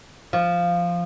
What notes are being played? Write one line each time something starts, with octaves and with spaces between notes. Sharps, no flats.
F3